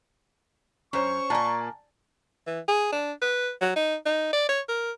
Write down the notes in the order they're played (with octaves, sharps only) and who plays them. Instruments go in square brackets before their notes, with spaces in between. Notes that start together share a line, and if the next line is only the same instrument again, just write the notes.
[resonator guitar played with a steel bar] F#2 [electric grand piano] C#4 C5 C#5 [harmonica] C#6
[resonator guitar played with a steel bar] A#2 A#3 [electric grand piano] D5 G#5 A5
[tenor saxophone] E3
G#4
D4
B4
F#3
D#4
D#4
D5
C#5
A#4